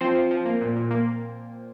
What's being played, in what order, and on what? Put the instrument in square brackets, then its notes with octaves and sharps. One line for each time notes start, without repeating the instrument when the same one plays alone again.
[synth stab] F3 C4 C5
F3
F3
A#3
A#2
A#2
A#3